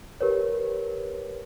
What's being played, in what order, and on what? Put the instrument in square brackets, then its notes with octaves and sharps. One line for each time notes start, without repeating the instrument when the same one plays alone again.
[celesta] G4 A#4 B4 C#5